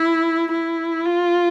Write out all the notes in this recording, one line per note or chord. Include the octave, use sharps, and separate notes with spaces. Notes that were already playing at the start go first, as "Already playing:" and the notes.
Already playing: E4
E4
F4